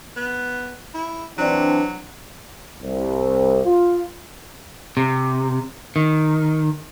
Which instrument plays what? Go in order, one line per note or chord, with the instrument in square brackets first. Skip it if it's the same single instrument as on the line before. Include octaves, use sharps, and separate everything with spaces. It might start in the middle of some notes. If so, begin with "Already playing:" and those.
[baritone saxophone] B3
E4
[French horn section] E3 C4 D4 [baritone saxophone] F#3
[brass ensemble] C2
F4
[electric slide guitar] C3
D#3